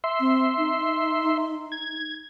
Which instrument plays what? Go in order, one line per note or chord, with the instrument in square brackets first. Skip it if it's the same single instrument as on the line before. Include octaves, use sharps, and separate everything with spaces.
[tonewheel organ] E5 C6
[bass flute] C4
D#4
[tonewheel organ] G#6